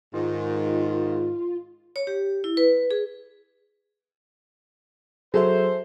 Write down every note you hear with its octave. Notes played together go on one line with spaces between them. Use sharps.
G#2 D#3 F4
C#5
G4
E4
B4
G#4
F#3 G#4 A4 C5 E5